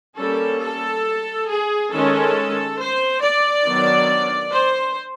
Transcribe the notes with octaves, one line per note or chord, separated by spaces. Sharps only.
G3 A#3 C#4 A4
A4
G#4
D#3 G#3 C#4 A4
C5
D5
D#3 F#3 B3 D4
C5